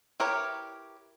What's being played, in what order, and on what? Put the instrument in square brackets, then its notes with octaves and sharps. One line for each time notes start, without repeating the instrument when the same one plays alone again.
[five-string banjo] E4 G4 A#4 B4 C#5